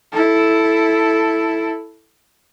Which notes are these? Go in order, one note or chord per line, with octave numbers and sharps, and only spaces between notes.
E4 A4